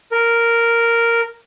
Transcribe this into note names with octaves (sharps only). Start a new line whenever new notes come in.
A#4